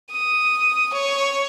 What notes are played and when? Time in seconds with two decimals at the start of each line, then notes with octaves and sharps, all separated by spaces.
0.11 D#6
0.93 C#5